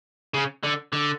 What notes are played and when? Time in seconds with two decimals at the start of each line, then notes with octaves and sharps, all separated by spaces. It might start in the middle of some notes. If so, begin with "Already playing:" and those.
0.34 C#3
0.64 D3
0.93 D3